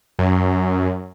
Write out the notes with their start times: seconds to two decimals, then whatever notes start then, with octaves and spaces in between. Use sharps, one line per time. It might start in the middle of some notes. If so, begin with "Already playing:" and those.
0.19 F#2